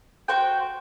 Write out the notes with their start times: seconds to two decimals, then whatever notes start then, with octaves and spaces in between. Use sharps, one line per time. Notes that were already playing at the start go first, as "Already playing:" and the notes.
0.28 F#4 C5 G5